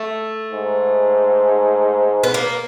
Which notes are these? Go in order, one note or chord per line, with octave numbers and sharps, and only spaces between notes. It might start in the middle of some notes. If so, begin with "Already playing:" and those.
Already playing: A3
G#2
B3
A#3